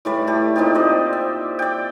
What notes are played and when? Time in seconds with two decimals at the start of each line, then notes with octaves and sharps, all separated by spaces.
0.05 A2 E3 G3 D5
0.27 A3 G4
0.56 A#2 C4 D#4 G4
0.75 C5 D5 D#5
1.13 E5
1.59 D5 G5